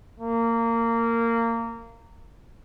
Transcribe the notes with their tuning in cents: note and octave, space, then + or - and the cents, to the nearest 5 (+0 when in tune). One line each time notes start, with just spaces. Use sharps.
A#3 -20